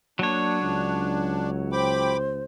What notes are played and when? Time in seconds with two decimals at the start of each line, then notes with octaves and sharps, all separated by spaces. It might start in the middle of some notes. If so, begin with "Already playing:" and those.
0.19 F#3 A#3 D4 C#5
0.62 C#2
1.72 C5 G5 B5 D6